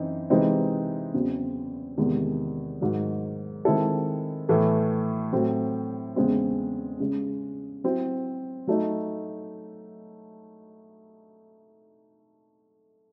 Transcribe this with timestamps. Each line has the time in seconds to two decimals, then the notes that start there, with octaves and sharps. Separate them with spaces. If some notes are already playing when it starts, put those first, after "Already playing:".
Already playing: F#2 E3 C4 D#4
0.30 C3 E3 G#3 C4 D#4
1.14 E2 C#3 F#3 C4
1.97 E2 C3 D#3 G#3
2.81 G#2 D#3 F#3
3.65 D#3 G#3 C4 E4 A4
4.49 A2 E3 A3
5.33 A2 F#3 C4
6.16 E2 C#3 G#3 C4
7.00 C#3 G#3 C#4
7.84 F#3 C4 E4
8.67 F#3 A3 D#4